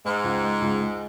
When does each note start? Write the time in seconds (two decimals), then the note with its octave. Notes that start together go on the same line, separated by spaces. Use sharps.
0.05 G#2 G#3
0.24 C#2
0.43 G#3
0.62 C#2
0.81 G#3